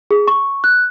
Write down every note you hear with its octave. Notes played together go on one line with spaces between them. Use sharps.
G#4
C#6
F#6